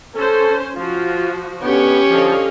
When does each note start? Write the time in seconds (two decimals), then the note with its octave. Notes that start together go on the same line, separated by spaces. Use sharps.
0.16 C#4 A4 C5
0.76 F3 F4 F#4
1.62 B2 D3 B3 C#4 G4 C#5
2.10 D3 F3 D#5 F5